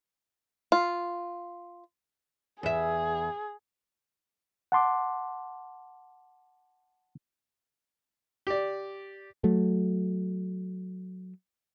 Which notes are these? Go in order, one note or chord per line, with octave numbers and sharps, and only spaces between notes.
F4
E2 G#4 E5
F#5 A5 C6 D6
G4 D5
F#3 A3